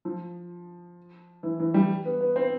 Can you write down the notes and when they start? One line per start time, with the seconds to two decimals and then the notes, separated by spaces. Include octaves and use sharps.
0.05 F3
1.43 E3
1.60 E3
1.74 G3
2.05 B3
2.21 B3
2.36 C4